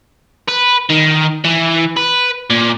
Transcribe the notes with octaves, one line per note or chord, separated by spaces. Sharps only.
B4
D#3
E3
B4
A#2